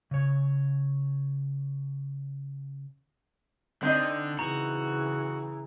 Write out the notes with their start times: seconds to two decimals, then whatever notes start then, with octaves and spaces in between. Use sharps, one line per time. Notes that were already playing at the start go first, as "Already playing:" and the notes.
0.11 C#3 C#5
3.83 D3 C4 D#4 D#5
4.39 C#3 E3 F#4 A#5